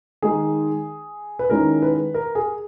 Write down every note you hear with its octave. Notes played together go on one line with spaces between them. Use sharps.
D#3 G#3 D#4 G#4
B4
D#3 G#3 C#4 E4 A#4
B4
A#4
G#4